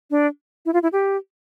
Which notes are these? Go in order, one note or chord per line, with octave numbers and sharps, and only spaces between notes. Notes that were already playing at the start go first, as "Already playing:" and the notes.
D4
E4
F4
E4
G4